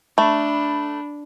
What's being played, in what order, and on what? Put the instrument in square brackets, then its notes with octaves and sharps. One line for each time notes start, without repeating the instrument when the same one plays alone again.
[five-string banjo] A3 [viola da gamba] D4 [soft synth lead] B5